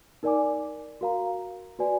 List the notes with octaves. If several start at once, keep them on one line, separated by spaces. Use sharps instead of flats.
D#4 A#4 D5 G#5 D6
F#4 A#4 F5 A#5
F#4 B4 D5 G#5